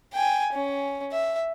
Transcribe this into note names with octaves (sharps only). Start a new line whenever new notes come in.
G5 G#5
C#4
E5